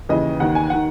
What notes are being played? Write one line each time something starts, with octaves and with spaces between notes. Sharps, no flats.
D#2 C#3 E3 D#5
D#2 D#3 F#5
G#5
D#3 F#5